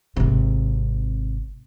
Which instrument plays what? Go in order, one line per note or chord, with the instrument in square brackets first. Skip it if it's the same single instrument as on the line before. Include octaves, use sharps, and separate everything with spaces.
[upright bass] G#1 C3